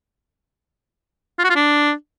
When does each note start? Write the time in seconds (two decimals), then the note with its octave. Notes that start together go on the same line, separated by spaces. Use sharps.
1.39 F4
1.44 F#4
1.50 F4
1.55 D4